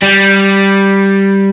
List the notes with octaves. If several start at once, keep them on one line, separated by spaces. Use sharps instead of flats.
G3